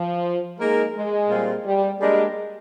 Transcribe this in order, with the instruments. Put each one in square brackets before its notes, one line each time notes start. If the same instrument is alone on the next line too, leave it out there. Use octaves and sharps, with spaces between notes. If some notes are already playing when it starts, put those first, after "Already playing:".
Already playing: [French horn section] F3
[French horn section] G#3 [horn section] A#3 D#4 A#4
[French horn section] G#3
[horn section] A#2 G3 C4 F4
[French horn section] G3
[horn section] G3 A#3 D4 G4 A#4 [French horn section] G#3